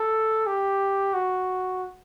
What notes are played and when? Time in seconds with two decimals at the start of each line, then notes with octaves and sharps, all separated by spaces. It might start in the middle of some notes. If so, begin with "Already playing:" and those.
Already playing: A4
0.47 G4
1.14 F#4